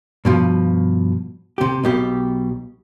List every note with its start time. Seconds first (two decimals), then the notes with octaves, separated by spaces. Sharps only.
0.25 G2 B2 F3
1.58 C3 G4
1.84 B1 B2 G4